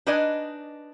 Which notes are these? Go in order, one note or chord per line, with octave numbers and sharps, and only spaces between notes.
D4 D#4 B4 D5 D#5 G#5